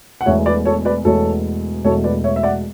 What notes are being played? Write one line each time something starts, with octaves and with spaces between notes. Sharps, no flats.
F#5
E1 E2 B2 A3 C#5 E5
B4 D5
A4 C#5
B4 D5
E1 E2 B2 A3 A4 C#5
E1 E2 B2 A3 A4 C#5
B4 D5
C#5 E5
E5
D5 F#5